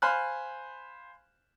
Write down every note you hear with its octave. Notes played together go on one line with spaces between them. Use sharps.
C5 F5 G#5 B5 F6 F#6